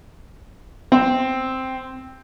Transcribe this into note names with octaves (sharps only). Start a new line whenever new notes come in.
C4